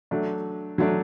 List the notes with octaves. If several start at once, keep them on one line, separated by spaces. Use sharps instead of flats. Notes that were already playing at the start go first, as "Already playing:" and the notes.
F#3 A3 D4
F#3 A3 D4